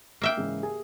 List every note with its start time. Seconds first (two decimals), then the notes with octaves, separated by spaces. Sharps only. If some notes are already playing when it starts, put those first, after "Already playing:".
0.22 A#3 E5 G5
0.37 G#2 C#3 E3
0.63 G4 G#4 G#5